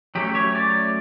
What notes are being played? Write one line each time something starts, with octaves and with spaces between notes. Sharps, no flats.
F#3 A3 C#4 G4
C#5
D5